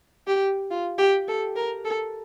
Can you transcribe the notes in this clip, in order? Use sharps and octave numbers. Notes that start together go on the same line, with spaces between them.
G4
F4
G4
A4
A#4
A4